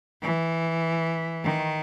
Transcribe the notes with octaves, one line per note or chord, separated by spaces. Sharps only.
E3
D#3